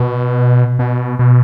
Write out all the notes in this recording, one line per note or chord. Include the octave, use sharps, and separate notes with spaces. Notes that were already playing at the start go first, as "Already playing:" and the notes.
Already playing: B2
B2
B2